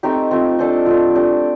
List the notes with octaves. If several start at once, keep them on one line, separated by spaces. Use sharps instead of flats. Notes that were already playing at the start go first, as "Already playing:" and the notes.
A3 C4 D#4 G4
F3 A3 C4
D4 A4 C5 D#5
F3 A3 D4
A3 D4 G4